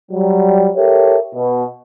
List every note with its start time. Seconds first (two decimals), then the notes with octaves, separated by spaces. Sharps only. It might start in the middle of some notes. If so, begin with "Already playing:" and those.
0.11 F#3 G3
0.76 G4 A4 A#4 C#5 E5
1.34 B2